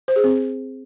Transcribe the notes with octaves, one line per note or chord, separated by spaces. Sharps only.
C5
G#4
C4